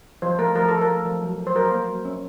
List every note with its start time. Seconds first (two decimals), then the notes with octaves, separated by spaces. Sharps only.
0.22 F3 C5
0.39 A3 A#4
0.55 F3 A#4
0.68 F3 A4
0.81 A#4
0.89 A3
1.05 F3
1.22 F#3
1.38 F#3
1.47 C5
1.55 F#3 A#4
1.65 C5
1.72 A#3
1.88 F#3
2.05 C#4